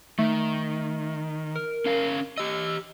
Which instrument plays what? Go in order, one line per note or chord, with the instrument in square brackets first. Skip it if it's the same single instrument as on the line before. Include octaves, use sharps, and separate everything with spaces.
[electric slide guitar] D#3 [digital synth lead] A3
[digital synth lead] A#4
[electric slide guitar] C#4 F5 A5
[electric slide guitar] G4 D#5 [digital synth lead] E6